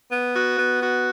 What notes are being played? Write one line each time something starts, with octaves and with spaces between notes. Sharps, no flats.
B3
F#4
B3
F#4